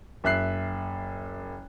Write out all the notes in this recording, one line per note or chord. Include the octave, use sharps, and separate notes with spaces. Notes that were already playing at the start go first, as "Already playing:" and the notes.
F#1 E5 F#6 C7